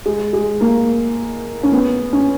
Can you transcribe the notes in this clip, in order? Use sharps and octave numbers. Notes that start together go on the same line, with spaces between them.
G#3
G#3
A#3
C#4
B3
C#4